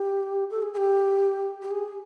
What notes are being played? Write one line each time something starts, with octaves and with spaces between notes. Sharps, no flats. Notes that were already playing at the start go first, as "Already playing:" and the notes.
Already playing: G4
A4
G#4
G#4
G4
G4
G#4